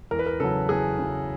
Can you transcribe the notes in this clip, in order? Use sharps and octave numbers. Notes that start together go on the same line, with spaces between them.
E2 A#4
B4
A#4
C#3 F#3 A4
E2 G#4
C#3 F#3